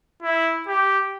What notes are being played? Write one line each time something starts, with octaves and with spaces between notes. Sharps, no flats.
E4
G4